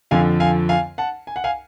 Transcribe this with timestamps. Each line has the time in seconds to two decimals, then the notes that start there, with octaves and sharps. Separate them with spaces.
0.11 F2 D3 F3 F5 G#5
0.40 F5 G#5
0.69 F5 G#5
0.98 F#5 A5
1.27 G#5
1.36 F#5
1.44 F5 G#5